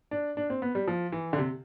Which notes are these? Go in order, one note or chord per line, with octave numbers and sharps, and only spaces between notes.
D4
D4
C4
B3
G3
F3
E3
D3
C3